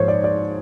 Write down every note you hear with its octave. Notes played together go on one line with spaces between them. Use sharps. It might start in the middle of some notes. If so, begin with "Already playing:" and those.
Already playing: G#2 F3 G#3 C5 C#5
D5
D5